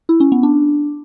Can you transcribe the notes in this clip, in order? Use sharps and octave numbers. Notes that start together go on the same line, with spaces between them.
E4
C#4
B3
D4